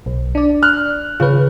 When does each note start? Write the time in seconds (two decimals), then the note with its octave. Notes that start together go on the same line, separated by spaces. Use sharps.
0.06 B1
0.35 D4 D5
0.63 F6 F#6
1.20 C#3 F4 B4